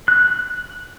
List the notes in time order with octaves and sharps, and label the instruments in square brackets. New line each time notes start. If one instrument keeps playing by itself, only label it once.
[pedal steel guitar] F#6